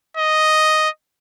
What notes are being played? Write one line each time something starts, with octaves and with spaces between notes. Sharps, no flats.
D#5